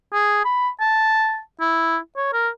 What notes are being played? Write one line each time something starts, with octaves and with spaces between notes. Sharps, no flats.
G#4
B5
A5
E4
C#5
A#4